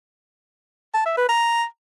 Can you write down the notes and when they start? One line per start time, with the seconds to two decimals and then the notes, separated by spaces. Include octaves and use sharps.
0.94 A5
1.06 E5
1.17 B4
1.29 A#5